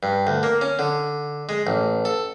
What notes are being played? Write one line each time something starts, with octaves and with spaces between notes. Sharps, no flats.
G2
D2
A#3
C#4
D3
G#3
A1
A4